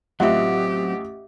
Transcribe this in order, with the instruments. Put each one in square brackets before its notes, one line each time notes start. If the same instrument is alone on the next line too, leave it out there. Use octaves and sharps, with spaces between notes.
[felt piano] A1 F4 F#5 [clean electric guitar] F#3 C4 [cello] G4 [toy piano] D#5 E5